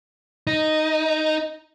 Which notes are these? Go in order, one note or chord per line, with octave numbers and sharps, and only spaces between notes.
D#4